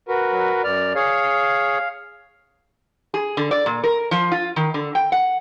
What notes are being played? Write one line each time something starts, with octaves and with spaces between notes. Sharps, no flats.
F#4 A#4 B4
F#3
F#2 D5 F6
G#4 C#5 F5
G#4
D3
D5
A#2
A#4
F3
F4
D#3
D3
G5
F#5